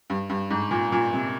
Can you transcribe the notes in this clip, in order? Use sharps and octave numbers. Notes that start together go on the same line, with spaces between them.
G2
G2
G#2
A#2
A#2
C3